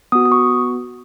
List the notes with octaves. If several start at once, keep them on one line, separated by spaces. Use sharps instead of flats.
B3 F#4 D#6
D#6
C#6